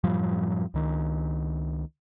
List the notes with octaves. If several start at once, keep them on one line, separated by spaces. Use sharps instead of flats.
F#2 A2 F3 G3
C#2 D#3